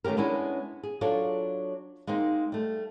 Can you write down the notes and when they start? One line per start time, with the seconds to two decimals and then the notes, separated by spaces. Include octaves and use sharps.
0.04 D#3 A3 C#4 G4 A#4
0.17 G#3 B3 C#4 D4 E4
0.83 G#4
1.01 F#3 D4 F4 A4 C#5
2.07 G#3 A#3 C4 D#4
2.52 G3 A3